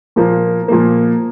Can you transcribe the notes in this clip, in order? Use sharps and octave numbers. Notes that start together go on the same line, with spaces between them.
A#2 F3 A#3
A#2 F3 A#3